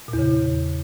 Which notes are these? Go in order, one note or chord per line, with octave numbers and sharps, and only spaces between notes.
A#2
E2
C#3